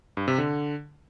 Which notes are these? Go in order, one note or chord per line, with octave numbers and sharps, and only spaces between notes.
G2
C3
D3